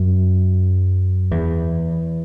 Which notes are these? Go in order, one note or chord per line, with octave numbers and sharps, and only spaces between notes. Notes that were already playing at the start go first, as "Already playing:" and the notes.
Already playing: F#2
E2